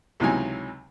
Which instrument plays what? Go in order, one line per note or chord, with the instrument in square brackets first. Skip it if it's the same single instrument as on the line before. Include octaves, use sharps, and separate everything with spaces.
[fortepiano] C#2 C3 E3 F#3 D#4 G#5